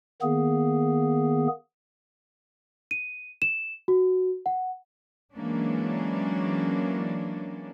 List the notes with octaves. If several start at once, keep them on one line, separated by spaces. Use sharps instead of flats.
D#3 A#3 B3 G#4
D#7
E7
F#4
F#5
E3 F#3 G#3 A#3 C#4 D4